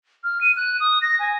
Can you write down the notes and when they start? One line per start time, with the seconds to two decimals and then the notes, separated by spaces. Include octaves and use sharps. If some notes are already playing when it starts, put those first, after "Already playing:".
0.24 F6
0.41 D#7
0.57 F#6
0.80 D#6
1.02 A#6
1.19 G#5